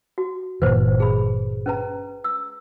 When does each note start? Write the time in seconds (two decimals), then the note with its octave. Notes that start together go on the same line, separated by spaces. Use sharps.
0.18 F#4
0.62 G1 A#2 E3 B4 C5
1.00 G#4 B5
1.66 C#4 B4 A#5
2.24 E6